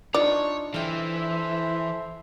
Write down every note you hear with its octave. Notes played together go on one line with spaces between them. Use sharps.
D4 D#4 F4 C#5 D5
E3 A4 C5 E5 F5 G5